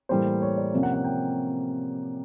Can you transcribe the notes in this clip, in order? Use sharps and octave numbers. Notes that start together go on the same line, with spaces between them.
A2 E3 G3 A#3 C5
C#5
D5
C3 F3 A#3 C#4
F#5
F#5
G5